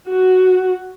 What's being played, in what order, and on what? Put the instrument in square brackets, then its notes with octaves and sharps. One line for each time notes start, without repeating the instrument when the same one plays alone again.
[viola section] F#4